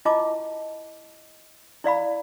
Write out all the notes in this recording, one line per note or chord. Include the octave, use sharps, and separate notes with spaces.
E4 F4 D#5 A5 D6
E4 D5 F5 B5